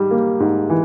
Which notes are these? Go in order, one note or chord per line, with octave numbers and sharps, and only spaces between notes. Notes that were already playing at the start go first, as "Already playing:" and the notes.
Already playing: G#2 G3
A#3
G#2
E3